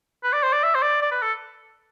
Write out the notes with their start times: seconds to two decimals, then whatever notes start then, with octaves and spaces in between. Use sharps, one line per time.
0.24 B4
0.33 D5
0.43 C5
0.53 D5
0.63 E5
0.75 C5
0.82 D5
1.02 D5
1.11 B4
1.22 A4